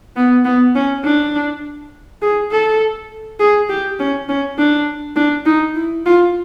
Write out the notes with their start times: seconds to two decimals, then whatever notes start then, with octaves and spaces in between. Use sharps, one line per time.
0.16 B3
0.45 B3
0.75 C#4
1.04 D4
2.22 G#4
2.51 A4
3.39 G#4
3.69 G4
3.99 C#4
4.29 C#4
4.58 D4
5.16 D4
5.46 D#4
5.75 E4
6.05 F4